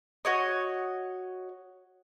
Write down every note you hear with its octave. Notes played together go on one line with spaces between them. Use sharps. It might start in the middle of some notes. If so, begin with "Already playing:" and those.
F#4 C#5 D#5